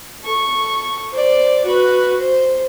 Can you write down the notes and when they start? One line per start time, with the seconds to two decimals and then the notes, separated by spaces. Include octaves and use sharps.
0.23 A4 C#6
1.13 C5 D5
1.65 F#4 B4
2.19 C5